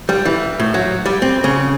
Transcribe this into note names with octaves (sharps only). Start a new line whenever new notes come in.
G3
E3
A2
F#3
G3
C4
C#3